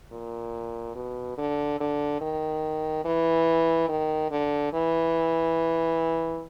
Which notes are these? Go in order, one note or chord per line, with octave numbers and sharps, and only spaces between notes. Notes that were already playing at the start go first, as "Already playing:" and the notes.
A#2
B2
D3
D3
D#3
E3
D#3
D3
E3